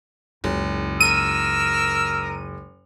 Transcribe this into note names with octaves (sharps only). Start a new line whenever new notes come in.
F#1 C#2
A#4 E6 F6 D#7